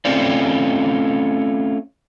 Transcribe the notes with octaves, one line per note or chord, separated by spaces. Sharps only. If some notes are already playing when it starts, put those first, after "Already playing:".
A3 C4 C#4 F4 C5 D5